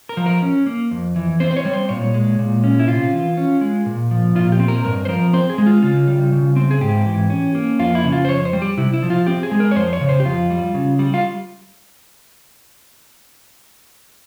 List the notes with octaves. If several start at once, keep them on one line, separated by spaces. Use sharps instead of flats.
A#4
F3
A#4
C#4
A#3
F2
E3
C4 C5
C5
C#5
G3
C5
A#2 C#5
G#3
A#2
C#4
E4
C3 F4
E3
C#4
G#3
A#2
F3
A#2 F4
G4
C4
A#4
G2 A#4
C5
F3 A#4
C4 C5
G#4
G#3
F4
C#3 F4
G3
C#3
C4
G#4
G#2 G4
E3
C#4
A#3
F2 F4
E4
C#3
F4
C5
F2 C#5
C5
G3
G4
C3 E4
E4
F3
F4
C4 G4
G#4
G#3
A#4
C#5
F2 C5
C#5
C#3
C5
G4
F2 F4
G3
C#3
G3
F4